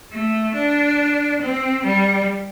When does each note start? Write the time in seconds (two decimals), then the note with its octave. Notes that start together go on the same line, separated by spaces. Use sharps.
0.12 A3
0.55 D4
1.41 C4
1.84 G3